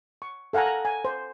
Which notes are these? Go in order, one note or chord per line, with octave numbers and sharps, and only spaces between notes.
C#6
A4 F5 F#5 G#5 A#5
A#5
G#5
C5